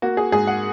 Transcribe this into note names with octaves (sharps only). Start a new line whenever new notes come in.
A#3 F#4
G#4
G#2 G#4
F#5